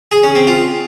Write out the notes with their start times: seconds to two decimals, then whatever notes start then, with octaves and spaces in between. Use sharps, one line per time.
0.12 G#4
0.23 C#4
0.35 C4
0.47 F4